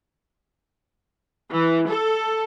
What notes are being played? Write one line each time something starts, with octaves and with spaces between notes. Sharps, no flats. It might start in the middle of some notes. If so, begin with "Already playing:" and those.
E3
A4